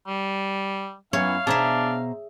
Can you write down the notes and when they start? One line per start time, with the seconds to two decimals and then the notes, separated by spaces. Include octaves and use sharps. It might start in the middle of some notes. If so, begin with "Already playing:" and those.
0.07 G3
1.13 F#2 E3 B3 E4 C#5 F5
1.47 B2 D4 G#4 C5 E5 A#5